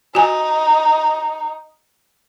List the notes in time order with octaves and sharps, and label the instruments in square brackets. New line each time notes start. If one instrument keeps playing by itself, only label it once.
[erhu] D#4 [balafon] F#4 G#5